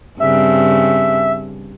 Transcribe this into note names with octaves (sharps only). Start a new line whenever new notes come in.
G2 C#3 C4 E5